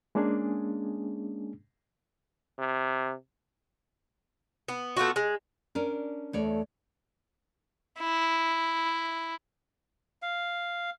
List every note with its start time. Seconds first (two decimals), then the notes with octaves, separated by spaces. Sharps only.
0.15 G#3 A#3 C#4 D4 G#4
2.59 C3
4.68 B3
4.97 A3 B3 F4 F#4
5.16 G#3
5.75 C#4 D4 A#4
6.33 E2 A3 C#5 D5
7.99 E4
10.22 F5